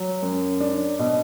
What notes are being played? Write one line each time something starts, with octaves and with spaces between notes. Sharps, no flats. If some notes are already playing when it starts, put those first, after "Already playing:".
Already playing: F#3
F#2
D4
B2